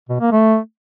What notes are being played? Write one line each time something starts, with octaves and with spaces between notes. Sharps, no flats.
B2
A#3
A3